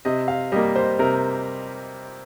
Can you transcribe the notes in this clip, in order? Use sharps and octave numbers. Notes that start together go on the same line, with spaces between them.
C3 D#5
F5
G3 A#3 D#5
C5
C3 A#4